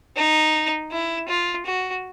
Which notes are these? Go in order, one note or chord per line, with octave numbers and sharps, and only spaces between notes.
D#4
E4
F4
F#4